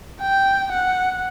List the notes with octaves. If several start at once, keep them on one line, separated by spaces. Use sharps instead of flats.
G5
F#5